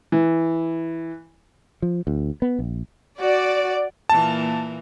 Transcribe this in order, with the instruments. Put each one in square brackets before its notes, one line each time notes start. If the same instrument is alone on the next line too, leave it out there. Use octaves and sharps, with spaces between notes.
[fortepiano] E3
[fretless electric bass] F3
D2
B3
A#1
[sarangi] F#4 [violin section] D5
[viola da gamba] A#2 E3 A#3 [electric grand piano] A5